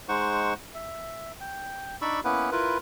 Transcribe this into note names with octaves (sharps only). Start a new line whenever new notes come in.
G#3 D#4 C5 F#5 C#6
E5
G5
D4 D#4 D5 B5 C#6 E6
A#3 B3 C#4 E4 B4
E4 F4 A#4 B4